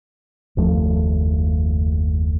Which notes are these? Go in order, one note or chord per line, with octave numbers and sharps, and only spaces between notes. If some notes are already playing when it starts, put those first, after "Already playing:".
F#1 D#2 F3 A3